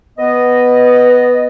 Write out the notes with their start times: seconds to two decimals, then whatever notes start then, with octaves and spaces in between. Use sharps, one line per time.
0.18 B3 D#5